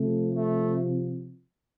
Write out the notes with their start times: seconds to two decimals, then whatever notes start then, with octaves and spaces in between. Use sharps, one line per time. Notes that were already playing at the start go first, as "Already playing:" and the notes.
Already playing: C3 F3 A3
0.35 A3